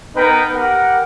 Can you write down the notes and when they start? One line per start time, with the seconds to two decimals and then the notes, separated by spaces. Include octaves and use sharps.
0.16 B3 D#4 A#4 B4 G5
0.54 G4 A#4 F#5